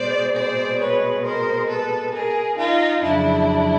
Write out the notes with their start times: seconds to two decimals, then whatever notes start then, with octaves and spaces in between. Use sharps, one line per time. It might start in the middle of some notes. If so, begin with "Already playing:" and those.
Already playing: B2 G#3 C5 D5
0.35 C5 D5
0.79 B4 C#5
1.23 A#4 C5
1.67 A4 B4
2.13 G#4 A#4
2.57 D#4 F4
3.01 F2 C#3 F#3 D4 E4